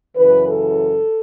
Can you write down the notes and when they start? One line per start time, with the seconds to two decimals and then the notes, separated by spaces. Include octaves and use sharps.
0.15 F#2 C#3 E3 B4
0.47 A4